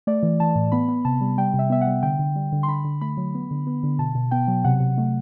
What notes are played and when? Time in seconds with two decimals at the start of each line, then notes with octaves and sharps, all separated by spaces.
0.07 A3 D5
0.23 E3
0.40 E3 A5
0.55 A2
0.72 B3 B5
0.88 B3
1.05 C3 A5
1.21 G3
1.38 G3 G5
1.54 C3
1.59 E5
1.70 B3 E5
1.81 F#5
1.87 G3
2.03 D3 G5
2.19 D3
2.36 G3
2.52 D3
2.63 C6
2.68 D3 B5
2.84 D3
3.01 A3 B5
3.17 F#3
3.34 B3
3.51 D3
3.67 B3
3.83 D3
3.99 B2 A5
4.15 B2
4.31 B3 G5
4.48 F#3
4.64 C3 F#5
4.80 C3
4.98 A3